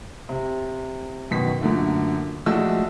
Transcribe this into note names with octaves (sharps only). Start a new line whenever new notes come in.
C3
F#2 B2 D#3 B6
F#2 A#2 D3 A3
A#1 G#3 A3 F#4 E6